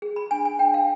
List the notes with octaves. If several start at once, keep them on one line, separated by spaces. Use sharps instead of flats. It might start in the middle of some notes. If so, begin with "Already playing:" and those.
G#4
B5
D4 G#5
G#5
D4 G5
F5